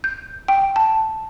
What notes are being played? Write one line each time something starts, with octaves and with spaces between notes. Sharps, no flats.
G6
G5
A5